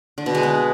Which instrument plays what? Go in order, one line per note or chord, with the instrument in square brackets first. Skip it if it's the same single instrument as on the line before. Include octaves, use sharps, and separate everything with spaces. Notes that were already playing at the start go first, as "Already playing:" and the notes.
[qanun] D3
B2
G#3
B3